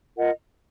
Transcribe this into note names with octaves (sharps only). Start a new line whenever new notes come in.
F4 A#4 D#5 F#5